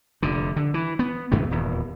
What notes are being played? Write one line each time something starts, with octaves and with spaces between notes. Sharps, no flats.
F1 D3
D3
E3
B3
C#2 G2 E3 B3
D#1 E2